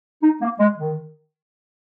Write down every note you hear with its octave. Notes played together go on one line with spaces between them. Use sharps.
D#4
A#3
G#3
D#3